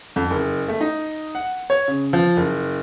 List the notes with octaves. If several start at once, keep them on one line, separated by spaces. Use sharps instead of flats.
F2
F#1
A3
D#4
F#5
C#5
C#3
F3
F#1